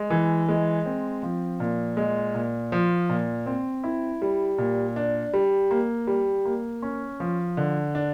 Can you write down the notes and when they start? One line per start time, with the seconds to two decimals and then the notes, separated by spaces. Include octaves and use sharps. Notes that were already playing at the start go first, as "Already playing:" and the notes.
Already playing: G#3
0.10 E3
0.49 G#3
0.86 C4
1.23 F3
1.60 A#2
1.97 G#3
2.35 A#2
2.72 F3
3.09 A#2
3.46 C4
3.84 E4
4.22 G3
4.58 A#2
4.96 D4
5.33 G3
5.71 A#3
6.07 G3
6.45 A#3
6.82 C#4
7.20 F3
7.57 D3
7.95 D4